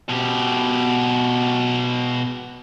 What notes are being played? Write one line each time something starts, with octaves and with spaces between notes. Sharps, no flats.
B2 G4